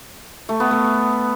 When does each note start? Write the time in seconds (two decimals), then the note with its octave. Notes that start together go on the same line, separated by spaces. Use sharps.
0.49 A3
0.60 B3
0.71 A3